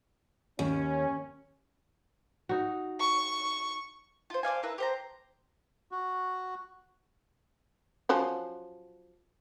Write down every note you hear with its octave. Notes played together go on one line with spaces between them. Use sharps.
D#2 C#4
D#4 F#4
C#6
F4 C5
C5 D5 F5 G#5
E4 A#4 B4 E6
G4 C5 A#5
F#4
F3 F#3 C#4